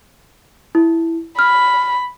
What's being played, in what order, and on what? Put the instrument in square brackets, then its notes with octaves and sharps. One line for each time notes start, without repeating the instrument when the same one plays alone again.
[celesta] E4
[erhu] B5 [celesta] F6